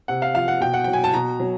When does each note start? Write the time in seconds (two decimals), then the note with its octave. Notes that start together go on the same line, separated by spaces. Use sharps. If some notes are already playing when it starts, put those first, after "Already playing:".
0.08 C3 F#5
0.22 F5
0.35 F3 F5
0.48 F#5
0.61 B2 G5
0.74 F#5
0.84 F#3 G5
0.93 G#5
1.04 A5
1.14 B2 A#5
1.40 F#3